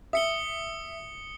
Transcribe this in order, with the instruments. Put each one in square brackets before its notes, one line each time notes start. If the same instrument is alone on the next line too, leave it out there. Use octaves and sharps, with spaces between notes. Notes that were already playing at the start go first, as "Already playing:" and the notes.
[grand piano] E5 [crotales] D#6 C#7 G7